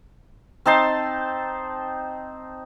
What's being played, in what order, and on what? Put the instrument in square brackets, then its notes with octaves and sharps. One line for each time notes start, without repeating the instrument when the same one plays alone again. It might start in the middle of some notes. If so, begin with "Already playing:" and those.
[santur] C4 D#4 A5 C6